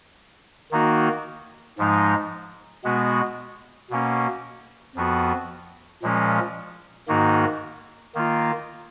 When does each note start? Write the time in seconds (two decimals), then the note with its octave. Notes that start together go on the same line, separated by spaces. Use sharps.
0.72 D#3 A#3 D#4 F#4
1.78 G#2 F3 G#3 D#4
2.84 B2 G#3 B3 F#4
3.90 B2 A#3 C#4
4.96 F2 F3 B3 F#4
6.02 A#2 F3 G#3 C#4
7.08 G#2 D#3 A#3 D#4 F#4
8.15 D#3 A#3 F4